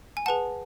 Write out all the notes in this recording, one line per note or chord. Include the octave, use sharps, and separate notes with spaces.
G#5
G#4 B4 F#5 A5